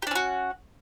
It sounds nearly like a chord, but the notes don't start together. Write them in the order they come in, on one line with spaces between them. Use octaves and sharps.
G4 D4 C#4 F#4